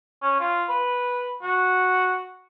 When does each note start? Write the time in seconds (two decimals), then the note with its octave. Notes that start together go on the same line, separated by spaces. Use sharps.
0.22 C#4
0.40 F4
0.69 B4
1.43 F#4